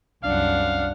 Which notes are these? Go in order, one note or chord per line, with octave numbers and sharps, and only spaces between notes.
C2 F#2 D4 F5 F#5